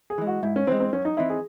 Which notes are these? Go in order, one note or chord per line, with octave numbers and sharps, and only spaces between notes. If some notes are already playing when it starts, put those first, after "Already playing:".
G#4
E3 G#3
F#4
G#2 E4
C#4
E3 G#3 C4
C4
F#2 C#4
D#4
E3 C4 D#4 E4
G#4